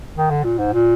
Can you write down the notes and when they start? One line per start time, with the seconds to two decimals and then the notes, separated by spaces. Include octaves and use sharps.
0.17 D#3
0.30 D3
0.44 A#2
0.58 G#2
0.73 A#2